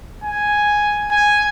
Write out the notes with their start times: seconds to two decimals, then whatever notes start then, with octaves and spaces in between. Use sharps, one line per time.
0.24 G#5
1.11 G#5